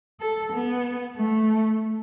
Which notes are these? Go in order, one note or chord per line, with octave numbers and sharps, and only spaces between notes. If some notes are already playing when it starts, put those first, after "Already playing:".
A4
B3
A3